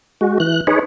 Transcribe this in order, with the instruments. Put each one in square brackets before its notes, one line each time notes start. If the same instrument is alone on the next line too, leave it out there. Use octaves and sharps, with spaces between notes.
[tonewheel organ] G#3 F#4
E3 F#6
D#4 G#4 B4 C#5